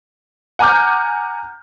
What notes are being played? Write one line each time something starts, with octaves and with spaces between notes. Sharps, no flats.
F#5 G#5 A#5 D6 F6 G6